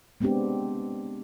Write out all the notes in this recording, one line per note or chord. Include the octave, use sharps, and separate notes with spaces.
G#3 B3 C4 D4 G4